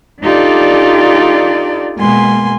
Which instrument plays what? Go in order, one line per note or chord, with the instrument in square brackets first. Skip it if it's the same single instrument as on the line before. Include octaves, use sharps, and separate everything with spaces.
[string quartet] D4 D#4 F4 G4 A4 D5
B2 G#3 A#3 G#5 C6